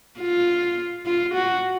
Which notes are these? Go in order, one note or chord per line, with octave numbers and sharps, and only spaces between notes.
F4
F4
F#4